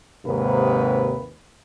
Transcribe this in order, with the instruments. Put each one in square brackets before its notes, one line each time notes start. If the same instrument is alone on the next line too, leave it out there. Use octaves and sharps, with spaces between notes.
[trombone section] D#2 G#2 C3 A#4 B4